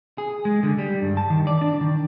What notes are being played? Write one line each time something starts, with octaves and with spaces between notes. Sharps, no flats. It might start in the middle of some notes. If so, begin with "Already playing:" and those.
G#4
G#3
D3
G3
G2
A5
D#3
D5
D4
D#3